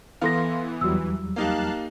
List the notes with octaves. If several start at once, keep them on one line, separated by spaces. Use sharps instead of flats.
E3 B3 E4 A4 F5 C6 A#6
E2 F#3 G3 F#4 E6
A#3 D#4 G4 F5 A5 F#6